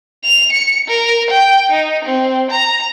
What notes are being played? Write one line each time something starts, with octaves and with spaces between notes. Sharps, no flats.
F7
C#7
A#4
G5
D#4
C4
A#5